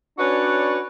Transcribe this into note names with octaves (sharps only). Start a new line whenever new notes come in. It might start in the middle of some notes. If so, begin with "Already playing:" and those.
C#4 D4 F#4 B4 C#5 D5